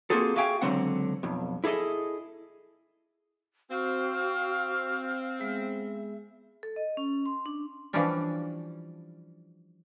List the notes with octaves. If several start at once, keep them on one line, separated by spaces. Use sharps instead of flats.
A#3 C4 F4 F#4 G#4 A4
F#4 G#4 E5 F5 G5 G#5
C#2 G2 D3 F#3 C4 F#5
B1 F2
E4 G#4 A4 D5 D#5
C4 F#4 F5
G#3 B3 G#4 E5
A4
D#5
C#4
C6
D4
E3 F3 G3 C#4 D4